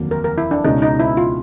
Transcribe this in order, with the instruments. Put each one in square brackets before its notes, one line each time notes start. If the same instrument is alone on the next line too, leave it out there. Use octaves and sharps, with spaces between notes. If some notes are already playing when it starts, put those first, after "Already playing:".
Already playing: [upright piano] F1 D#2 D3 F#3 A#3
[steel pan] A#4
A#4
E4
D4
[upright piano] C#2 B2 G#3 C#4 [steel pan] D#4
[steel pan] D#4
E4
F4